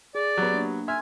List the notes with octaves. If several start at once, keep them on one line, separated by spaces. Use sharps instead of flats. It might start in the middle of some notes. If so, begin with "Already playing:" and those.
G#4 D5
F#3 B3 G4
A#3 D4
E5 G#5 C6 F6